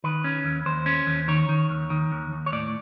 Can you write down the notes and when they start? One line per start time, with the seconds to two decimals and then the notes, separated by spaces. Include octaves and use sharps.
0.04 D#3 B4
0.24 C#4
0.45 D#2
0.66 D#2 C5
0.86 C#4
1.07 D#2
1.28 D#3 C#5
1.49 D#3
1.70 D#2
1.90 D#3
2.12 D#2
2.32 D#2
2.46 C#5
2.52 A2 D5